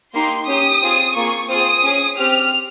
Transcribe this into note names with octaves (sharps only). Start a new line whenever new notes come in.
A#3 D#4 G4 C6
C#4 G4 D#6
C4 F4 G#4
A#3 F4 G#4 C#6
C4 F4 G#4 D#6
C#4 G#4
C4 G4 F6